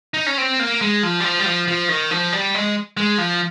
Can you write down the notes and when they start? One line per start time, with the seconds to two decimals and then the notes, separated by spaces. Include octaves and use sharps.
0.14 D#4
0.26 C#4
0.38 C4
0.60 A#3
0.81 G#3
1.03 F3
1.20 G3
1.24 F3
1.40 G3
1.46 F3
1.68 F3
1.89 D#3
2.11 F3
2.33 G3
2.54 G#3
2.97 G#3
3.18 F3